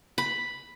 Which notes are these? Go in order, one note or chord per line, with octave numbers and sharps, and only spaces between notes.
B5